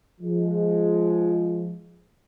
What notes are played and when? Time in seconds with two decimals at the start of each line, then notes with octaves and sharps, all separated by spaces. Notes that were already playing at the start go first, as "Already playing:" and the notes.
0.21 F3 G#3